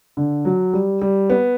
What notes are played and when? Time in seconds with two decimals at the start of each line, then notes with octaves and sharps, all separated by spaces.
0.17 D3
0.45 F#3
0.73 G3
1.02 G3
1.30 B3